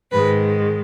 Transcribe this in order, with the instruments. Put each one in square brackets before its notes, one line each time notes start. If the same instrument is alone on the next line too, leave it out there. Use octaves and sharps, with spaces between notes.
[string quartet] G#2 D#3 G#3 B4